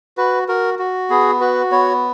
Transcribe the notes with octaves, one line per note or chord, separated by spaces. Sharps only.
F#4 B4
F#4 A#4
F#4
B3 G#4
F#4 B4
B3 C#5